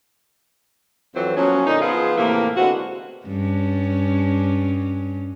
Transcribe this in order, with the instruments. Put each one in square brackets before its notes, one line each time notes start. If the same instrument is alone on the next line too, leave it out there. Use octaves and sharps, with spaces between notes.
[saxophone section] F2 E3 F#3 C4 C5
F3 F#3 A#3 B3 C#4
A#2 D3 D#4
F3 B3 F4 G#4
A2 C3 E3 A#3
D3 G#3 B3 C4 F#4
[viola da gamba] G2 C#4